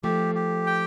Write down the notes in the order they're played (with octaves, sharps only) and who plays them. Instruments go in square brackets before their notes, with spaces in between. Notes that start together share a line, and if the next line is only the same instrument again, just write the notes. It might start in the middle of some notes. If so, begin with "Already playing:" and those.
[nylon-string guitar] F3 A3 [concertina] G4
[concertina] G4
G5